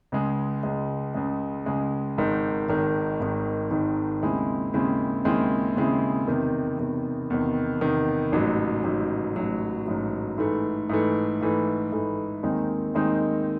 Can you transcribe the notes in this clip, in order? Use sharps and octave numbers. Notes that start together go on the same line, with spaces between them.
C#2 C#3 G#3
C#2 C#3 G#3
C#2 C#3 G#3
C#2 C#3 G#3
G#1 G#2 D#3
G#1 G#2 D#3
G#1 G#2 D#3
G#1 G#2 D#3
D#2 C#3 G#3 C4 E4
D#2 C#3 G#3 C4 E4
D#2 C#3 G#3 C4 E4
D#2 C#3 G#3 C4 E4
E2 C3 D#3
E2 C3 D#3
E2 C3 D#3
E2 C3 D#3
A1 G#2 F#3
A1 G#2 F#3
A1 G#2 F#3
A1 G#2 F#3
G#2 E3 A3
G#2 E3 A3
G#2 E3 A3
G#2 E3 A3
D#2 D#3 G#3 C4 D#4
D#2 D#3 G#3 C4 D#4